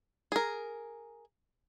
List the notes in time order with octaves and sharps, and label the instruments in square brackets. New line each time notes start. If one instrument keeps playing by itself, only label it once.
[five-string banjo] G#4 A#4